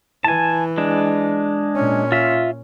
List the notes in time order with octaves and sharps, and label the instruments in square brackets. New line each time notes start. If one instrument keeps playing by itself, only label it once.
[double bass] E3 [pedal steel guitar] G#5 A5
[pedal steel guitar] G#3 D4
[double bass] A#2 C#4
[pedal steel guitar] F4 E5